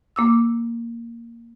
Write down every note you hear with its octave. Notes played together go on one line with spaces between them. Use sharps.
A#3 D6 E6